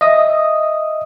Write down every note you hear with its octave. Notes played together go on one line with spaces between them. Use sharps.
D#5 E5 D#6